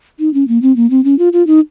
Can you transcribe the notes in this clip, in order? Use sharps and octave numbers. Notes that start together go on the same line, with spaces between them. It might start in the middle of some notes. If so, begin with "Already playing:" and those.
D#4
C#4
A#3
C4
A#3
C4
C#4
F4
F4
D#4